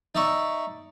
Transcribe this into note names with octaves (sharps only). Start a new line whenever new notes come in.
D#4 D5 E5 C#6